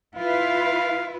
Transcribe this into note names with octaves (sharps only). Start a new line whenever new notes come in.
E4 F4 B4 F5